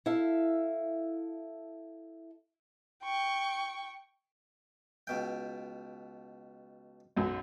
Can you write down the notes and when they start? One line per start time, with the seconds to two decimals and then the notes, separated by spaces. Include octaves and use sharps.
0.06 E4 A4 E5 F5
3.03 G5 C#6
5.07 C#2 B2 G5
7.16 B1 F#2